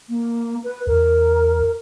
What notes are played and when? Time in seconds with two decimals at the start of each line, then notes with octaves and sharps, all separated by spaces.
0.09 A#3
0.64 B4
0.87 E2 A#4